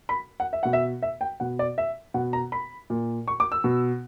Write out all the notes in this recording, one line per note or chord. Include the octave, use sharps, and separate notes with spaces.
B5
F#5
E5
B2 F#5
E5
E5
G5
B2 F#5
D5
E5
B2 F#5
A#5
B5
A#2
C#6
D6
E6
B2